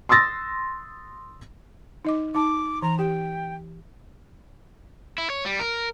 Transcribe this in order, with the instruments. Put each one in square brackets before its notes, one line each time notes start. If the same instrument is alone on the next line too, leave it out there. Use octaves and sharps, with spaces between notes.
[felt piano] C6 D#6 E6 A6 A#6
[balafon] D#4 D#5 D6
[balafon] D#4 A5 [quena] D6
[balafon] E3 [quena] A#5
[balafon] G4 [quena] G5
[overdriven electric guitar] E4
C#5
G3
A#4